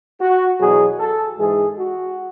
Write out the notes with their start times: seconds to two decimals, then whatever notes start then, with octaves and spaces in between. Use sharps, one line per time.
0.21 F#4
0.60 E2 B2 F#3 G#4
0.99 A4
1.38 G#2 E3 G#3 G#4
1.76 F#4